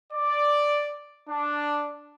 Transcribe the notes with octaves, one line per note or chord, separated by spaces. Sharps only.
D5
D4